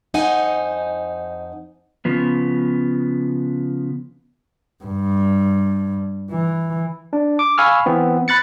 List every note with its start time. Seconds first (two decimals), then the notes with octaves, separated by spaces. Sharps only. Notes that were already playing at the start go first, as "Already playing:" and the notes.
0.14 F2 D#4 C5 F#5 G#5
2.05 C#3 F3 B3
4.84 G2
6.31 E3
7.13 D4
7.39 D6
7.58 F5 G#5 B5 C#6 E6 F6
7.86 E3 B3 C4
8.28 B5 F#6 A6 C#7